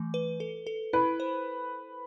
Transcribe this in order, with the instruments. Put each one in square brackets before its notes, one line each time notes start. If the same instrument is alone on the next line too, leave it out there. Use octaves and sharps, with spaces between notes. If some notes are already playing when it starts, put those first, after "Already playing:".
Already playing: [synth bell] E3 A3
B4
A4
A4
[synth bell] E4 [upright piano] B4
[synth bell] C5